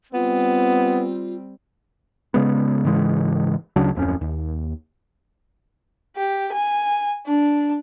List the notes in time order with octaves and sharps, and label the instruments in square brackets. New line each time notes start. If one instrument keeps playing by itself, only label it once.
[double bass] G3 C4 [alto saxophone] B3 [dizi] F4
[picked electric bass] C#3 G#3 B3
G#2 C#3 E3 G#3
D2 C#3 F#3 D4
D1 F2 C#4
D#2
[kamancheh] G4
G#5
D4